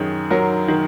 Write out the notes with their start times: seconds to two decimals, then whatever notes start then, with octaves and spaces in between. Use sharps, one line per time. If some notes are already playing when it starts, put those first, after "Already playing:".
Already playing: F#2 D#3 G#4
0.30 F#3 A#4
0.68 D#3